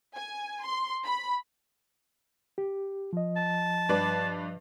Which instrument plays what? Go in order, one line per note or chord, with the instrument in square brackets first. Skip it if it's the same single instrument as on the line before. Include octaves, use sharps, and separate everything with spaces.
[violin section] G#5
C6
B5
[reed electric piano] G4
F3 D#5
[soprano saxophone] A5
[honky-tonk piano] G2 B4 D5